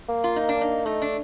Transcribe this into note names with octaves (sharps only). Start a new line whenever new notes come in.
A#3
F4
D#4
D4
D#4
A3 D#4
D4